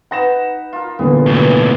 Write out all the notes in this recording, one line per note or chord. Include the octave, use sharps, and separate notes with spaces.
D#4 B4 F#5 A#6 E7
F4 A#4
E2 A#2 D3 B3
B1 A2 E3 F#4 G4